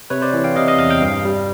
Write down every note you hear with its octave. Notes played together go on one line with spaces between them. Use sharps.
C3 B4 C#5
C5 D5
E3
F5 G5
C3 D#5 F5
D#5 F5
E2 D#5 F5
F5 G5
G2
G3